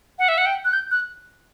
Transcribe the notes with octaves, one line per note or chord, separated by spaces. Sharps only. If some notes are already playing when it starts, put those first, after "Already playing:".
F#5
E5
F#5
G5
F#6
G6
F#6